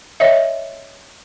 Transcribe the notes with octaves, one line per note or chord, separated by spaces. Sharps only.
C#5 D#5 E5